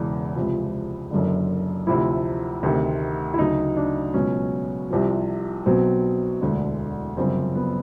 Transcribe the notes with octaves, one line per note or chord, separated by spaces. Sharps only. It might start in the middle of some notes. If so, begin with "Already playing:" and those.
Already playing: E1 E2 C#3 E3
C#2 C3 F3
F#1 F#2 D3
D2 C3 F3 E4
D2 C3 D#3
E4
D2 C#3 F#3 D#4
D4
C#2 B2 F#3 C#4
C2 C3 F3
B1 B2 F#3 C4
E1 D2 D3
G1 F#2 C#3 F3 C4
B3